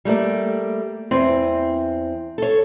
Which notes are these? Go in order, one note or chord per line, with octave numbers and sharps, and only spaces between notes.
G3 A3 A#3 D5
E2 C4
A4 C#5